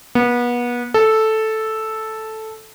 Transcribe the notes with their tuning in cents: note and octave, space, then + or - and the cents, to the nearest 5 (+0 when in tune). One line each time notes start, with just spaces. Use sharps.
B3 -30
A4 -5